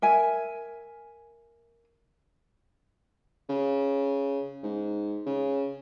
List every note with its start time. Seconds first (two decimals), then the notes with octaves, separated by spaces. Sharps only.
0.02 A#4 E5 G#5
3.49 C#3
4.63 G#2
5.26 C#3